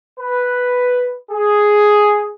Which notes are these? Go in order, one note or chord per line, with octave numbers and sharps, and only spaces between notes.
B4
G#4